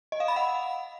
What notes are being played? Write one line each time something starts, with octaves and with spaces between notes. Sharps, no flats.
D#5
F5
B5
F#5